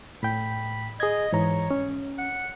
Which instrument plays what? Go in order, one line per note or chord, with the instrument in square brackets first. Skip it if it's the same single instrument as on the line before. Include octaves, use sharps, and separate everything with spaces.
[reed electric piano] A2 G5 [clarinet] B5
[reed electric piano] G#4 G#6 [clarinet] D#5
[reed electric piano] G#2 E3 A#5 [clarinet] C#5
[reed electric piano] C#4
[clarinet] F#5